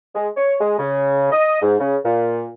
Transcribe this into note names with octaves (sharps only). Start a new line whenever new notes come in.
G#3
C#5
G#3
C#3
D#5
G#2
C#3
A#2